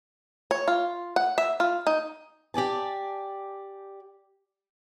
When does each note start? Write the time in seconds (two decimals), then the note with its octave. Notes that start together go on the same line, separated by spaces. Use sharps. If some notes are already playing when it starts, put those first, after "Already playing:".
0.51 C#5
0.68 F4
1.16 F#5
1.38 E5
1.60 F4
1.87 D#4
2.54 G4 D5 G#5 A5